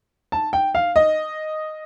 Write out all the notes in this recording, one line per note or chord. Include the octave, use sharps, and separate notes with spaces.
A5
G5
F5
D#5